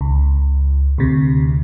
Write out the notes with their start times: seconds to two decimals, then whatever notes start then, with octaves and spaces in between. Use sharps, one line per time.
0.01 C#2
0.98 D2 C3